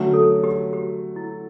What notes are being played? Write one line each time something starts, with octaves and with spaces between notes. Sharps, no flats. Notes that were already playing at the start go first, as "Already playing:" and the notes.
Already playing: D3 F#3 A3 C#4 F#4
A4
G4
G4
E4